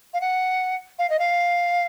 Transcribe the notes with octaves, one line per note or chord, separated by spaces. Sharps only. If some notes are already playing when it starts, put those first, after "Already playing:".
F5
F#5
F5
D#5
F5